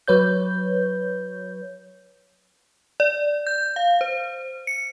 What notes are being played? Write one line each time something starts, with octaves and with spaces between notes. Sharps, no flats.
F#3 B4 C#5 G6
D5
G6
F5
C5
C#7